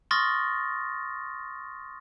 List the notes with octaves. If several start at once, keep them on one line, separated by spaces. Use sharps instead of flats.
C6 C#6 D#6 F6 A6 A#6